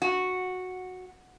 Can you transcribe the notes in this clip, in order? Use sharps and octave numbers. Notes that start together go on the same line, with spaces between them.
F#4